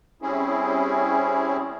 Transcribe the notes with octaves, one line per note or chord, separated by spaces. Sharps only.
G3 C4 C#4 E4 G#4